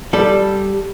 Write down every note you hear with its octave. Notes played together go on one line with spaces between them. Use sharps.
G3 A4